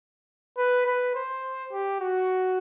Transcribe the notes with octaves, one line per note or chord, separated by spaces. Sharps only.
B4
B4
C5
G4
F#4